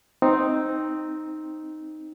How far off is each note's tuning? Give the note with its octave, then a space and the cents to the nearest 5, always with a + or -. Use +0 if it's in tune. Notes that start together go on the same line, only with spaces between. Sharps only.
C4 +0 D#4 +0